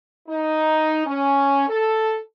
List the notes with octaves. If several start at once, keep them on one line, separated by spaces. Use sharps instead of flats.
D#4
C#4
A4